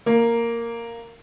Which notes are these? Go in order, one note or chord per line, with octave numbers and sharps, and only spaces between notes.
A#3